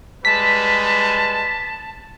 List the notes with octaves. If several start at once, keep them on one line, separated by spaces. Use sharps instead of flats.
G3 G#3 B4 A5 B6